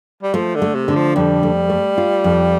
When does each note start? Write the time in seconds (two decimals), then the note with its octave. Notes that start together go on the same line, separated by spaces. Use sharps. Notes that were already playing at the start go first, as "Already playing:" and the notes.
0.23 G3
0.34 F3 A3
0.55 D3
0.62 A3
0.75 C3
0.88 D3
0.95 F3
1.15 F2 G3
1.43 A3
1.70 A3
1.98 F4
2.24 F2